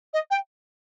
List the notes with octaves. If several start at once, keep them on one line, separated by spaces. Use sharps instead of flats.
D#5
G5